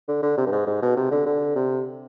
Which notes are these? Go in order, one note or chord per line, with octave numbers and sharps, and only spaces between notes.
D3
D3
C3
G2
G#2
G#2
B2
C3
D3
D3
C3